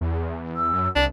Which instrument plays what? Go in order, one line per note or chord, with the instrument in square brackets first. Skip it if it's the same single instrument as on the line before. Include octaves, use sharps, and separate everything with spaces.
[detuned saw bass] E2
[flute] E6
[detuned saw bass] F#2
[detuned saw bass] C2 [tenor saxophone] D4